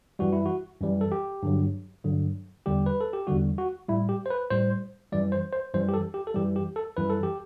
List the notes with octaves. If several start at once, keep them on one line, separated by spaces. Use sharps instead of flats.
F#2 E3 G3 F#4
E4
F#4
F#2 E3 G3
A4
G4
G2 D3 F#3
G2 D3 F#3
E2 D3 G3 G4
B4
A4
G4
E2 D3 G3 F#4
F#4
A2 G3 E4
G4
C5
B4
A2 G3 C5
F#2 E3 G3 D5
C5
C5
F#2 E3 G3 C5
G4
A4
G4
A4
F#2 E3 G3 G4
G4
A4
F#2 E3 G3 B4
A4
G4